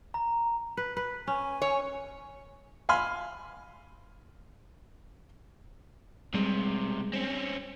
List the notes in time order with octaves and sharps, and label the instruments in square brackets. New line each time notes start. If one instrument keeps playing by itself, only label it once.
[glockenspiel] A#5
[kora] B4
B4
[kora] C#4 [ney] G#5
[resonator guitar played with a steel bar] C#5
[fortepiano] F5 G#5 B5 C6 F6
[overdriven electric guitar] B1 C3 [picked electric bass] G3 G#3
[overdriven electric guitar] C4 C#4